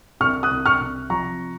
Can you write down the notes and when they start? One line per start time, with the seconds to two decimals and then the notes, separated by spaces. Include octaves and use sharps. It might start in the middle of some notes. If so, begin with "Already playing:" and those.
0.20 C2 C#6 F6
0.43 D#6 F#6
0.51 C2
0.66 C#6 F6
0.80 C3
1.10 F3 A#5 C#6